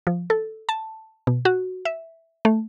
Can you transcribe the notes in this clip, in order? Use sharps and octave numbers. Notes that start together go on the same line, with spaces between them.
F3
A4
A5
B2
F#4
E5
A3